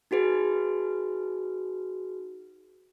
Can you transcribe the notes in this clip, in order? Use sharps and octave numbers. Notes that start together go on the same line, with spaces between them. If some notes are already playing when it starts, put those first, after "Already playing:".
D#4 F#4 G#4 B4